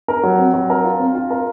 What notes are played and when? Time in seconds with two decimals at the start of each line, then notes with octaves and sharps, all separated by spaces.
0.08 A#4
0.23 F#3
0.38 C4
0.54 F#3
0.70 A#4
0.84 F4
0.99 C4
1.15 F4
1.30 A#4